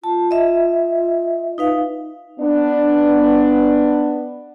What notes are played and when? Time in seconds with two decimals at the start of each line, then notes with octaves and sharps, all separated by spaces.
0.04 F4 A5
0.31 D#5 E5
1.58 D#4 B4 F5
2.40 B3 D4